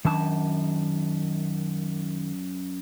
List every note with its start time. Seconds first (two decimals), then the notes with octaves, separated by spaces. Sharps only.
0.05 F#2 D#3 D4 A5